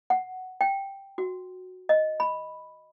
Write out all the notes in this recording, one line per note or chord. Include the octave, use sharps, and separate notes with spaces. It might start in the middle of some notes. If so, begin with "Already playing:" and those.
F#5
G5
F#4
D#5
B5